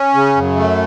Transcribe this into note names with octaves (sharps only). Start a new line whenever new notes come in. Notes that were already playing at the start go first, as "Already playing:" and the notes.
Already playing: C#4
C#3
F#2
A3